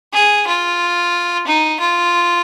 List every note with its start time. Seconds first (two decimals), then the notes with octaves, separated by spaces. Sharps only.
0.13 G#4
0.47 F4
1.47 D#4
1.80 F4